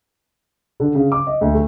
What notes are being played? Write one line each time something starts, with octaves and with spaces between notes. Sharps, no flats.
D3
C#3
D6
D#5
D2
A3